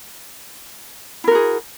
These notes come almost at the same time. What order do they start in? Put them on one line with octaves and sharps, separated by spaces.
E4 A#4 F#4 G#4